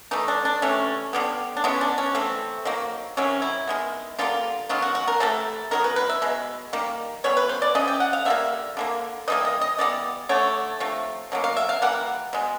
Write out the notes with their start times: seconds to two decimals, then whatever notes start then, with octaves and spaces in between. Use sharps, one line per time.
0.11 E3 A3 D#4
0.28 D4
0.45 D4
0.62 C3 E3 A3 C#4
1.13 D3 G3 B3
1.57 D4
1.64 E3 G#3 B3 C#4
1.81 D4
1.98 C#4
2.15 E3 A3 C4
2.65 D#3 F#3 A#3
3.17 C3 D#3 F#3 C#4
3.42 E4
3.67 D#3 G#3 B3
4.19 D3 G3 A#3 F4
4.69 D#3 F#3 B3 F4
4.82 F#4
4.95 F#4
5.08 A#4
5.20 C3 E3 A3 A4
5.71 D#3 F#3 B3 A#4
5.84 B4
5.96 B4
6.09 E5
6.22 B2 G#3
6.73 D#3 G3 A#3
7.24 E3 G3 B3 C#5
7.37 B4
7.49 C5
7.62 D5
7.75 C#3 E3 D#5
7.88 G5
8.00 F#5
8.13 F5
8.25 D3 G3 A#3 E5
8.77 D3 G3 A#3
9.28 E3 G3 A#3 D#5
9.45 D#5
9.61 D#5
9.78 E3 G3 B3 D5
10.29 D3 F#3 A3 C#5
10.80 C3 F3 A3
11.32 B2 F#3 A#3
11.44 F5
11.57 E5
11.69 F5
11.82 E3 G3 A#3 F#5
12.33 B2 G#3